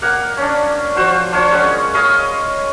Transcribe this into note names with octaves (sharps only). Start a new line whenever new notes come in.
A#3 F#5
C#4 D4
F3 F#4 C5
D4 F4 C5 C#5
G#3 C#4 D#5 F#5
C#5 D#5 F5 B5